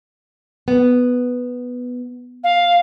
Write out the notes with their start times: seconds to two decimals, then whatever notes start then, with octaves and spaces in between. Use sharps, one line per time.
0.68 B3
2.44 F5